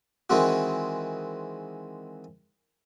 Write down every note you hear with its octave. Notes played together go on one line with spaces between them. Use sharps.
D#3 E3 G#3 C4 F#4